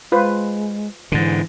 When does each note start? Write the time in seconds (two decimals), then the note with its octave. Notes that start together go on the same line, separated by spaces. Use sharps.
0.12 G#3 F4 B4 C5
1.12 G#2 D3 E3